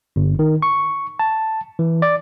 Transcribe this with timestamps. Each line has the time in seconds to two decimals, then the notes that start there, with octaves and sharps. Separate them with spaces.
0.16 G1
0.39 D#3
0.62 C#6
1.19 A5
1.79 E3
2.02 D5